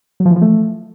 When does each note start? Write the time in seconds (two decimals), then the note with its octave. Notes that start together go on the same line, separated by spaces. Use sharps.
0.20 F#3
0.25 F3
0.31 E3
0.36 F3
0.41 A3